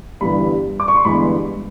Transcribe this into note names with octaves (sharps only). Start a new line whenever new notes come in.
G1 G2 E3 G3 B5
D6
C#6
C6
G1 G2 E3 G#3 B3 B5